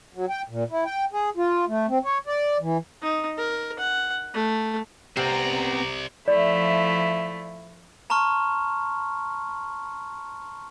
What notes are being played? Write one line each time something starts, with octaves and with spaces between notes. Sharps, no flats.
F#3
G5
A#2
E4
G5
G#4
F4
A3
C4
C#5
D5
E3
D#4
A#4
F#5
A3
C3 B3 C4 C5 D5 A#5
F3 A3 E4 D5
A5 A#5 C6 C#6 F6